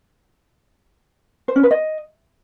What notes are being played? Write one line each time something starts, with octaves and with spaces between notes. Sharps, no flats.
C5
C#4
B4
D#5